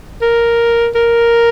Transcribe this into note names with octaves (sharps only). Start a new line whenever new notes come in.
A#4
A#4